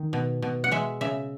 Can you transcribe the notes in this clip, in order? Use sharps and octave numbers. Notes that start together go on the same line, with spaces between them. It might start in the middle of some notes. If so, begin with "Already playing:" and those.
Already playing: D#3
B2
B2
F#5
G#3 E5
C#3 E5